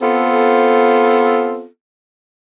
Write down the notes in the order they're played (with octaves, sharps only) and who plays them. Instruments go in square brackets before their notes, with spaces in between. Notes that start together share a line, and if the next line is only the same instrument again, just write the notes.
[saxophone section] B3 C4 F4 A4